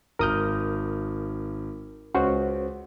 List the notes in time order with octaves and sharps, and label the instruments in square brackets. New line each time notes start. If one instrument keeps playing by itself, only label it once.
[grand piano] G#1 F6 [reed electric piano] A#4 D#6 G6
[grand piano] C#2 [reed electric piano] C#4 F#4 C5